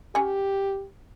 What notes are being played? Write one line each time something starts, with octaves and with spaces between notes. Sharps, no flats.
C#4 G4 F#5 G#5